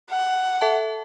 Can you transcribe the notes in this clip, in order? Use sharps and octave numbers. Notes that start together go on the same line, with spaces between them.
F#5
A4 E5 A5